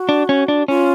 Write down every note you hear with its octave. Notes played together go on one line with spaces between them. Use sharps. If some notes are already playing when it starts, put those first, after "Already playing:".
Already playing: F#4
D4
C#4
D4
C#4 F4